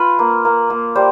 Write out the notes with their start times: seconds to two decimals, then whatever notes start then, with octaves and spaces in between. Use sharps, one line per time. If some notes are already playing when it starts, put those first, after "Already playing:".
Already playing: F4 B4
0.19 A#3
0.45 A#3
0.70 A#3
0.95 G3 C5